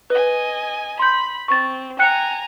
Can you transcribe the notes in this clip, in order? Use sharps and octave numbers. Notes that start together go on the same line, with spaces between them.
B4 D#5 G#5
B5 C6 G6
C4 C#6 A6
G5 G#5 A#5 F#6 C#7